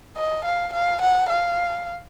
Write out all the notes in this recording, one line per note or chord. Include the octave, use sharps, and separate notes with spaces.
D#5
F5
F5
F#5
F5